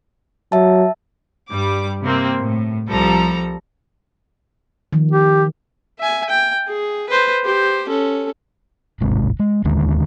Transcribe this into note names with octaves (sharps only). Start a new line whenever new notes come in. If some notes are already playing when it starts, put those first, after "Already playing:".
F#3 E5 A5
G2 G3 D6
C3 A#3 C4
A2
C2 F3 G3 A4 A#5
D#3 F3
G4
E5 G#5
G5
G#4
B4 C5
G4 C5
C#4 A4
D1 G#1 C3 G#3
G#3
D1 D#2 D3 G#3